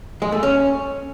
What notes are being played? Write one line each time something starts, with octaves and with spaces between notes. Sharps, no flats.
G#3
A3
C#4